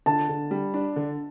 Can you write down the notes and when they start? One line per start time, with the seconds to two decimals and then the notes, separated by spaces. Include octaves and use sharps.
0.06 D3 A5
0.29 D3
0.51 G3
0.74 D4
0.96 D3